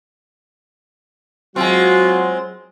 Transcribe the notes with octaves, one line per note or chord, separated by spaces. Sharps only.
F#3 G#3 C4 F4 F#4